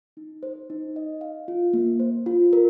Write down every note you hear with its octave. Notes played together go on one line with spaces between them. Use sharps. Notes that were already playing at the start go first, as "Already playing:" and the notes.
D#4
C5
D#4
D#5
F5
F4
A#3
C5
F4
A#4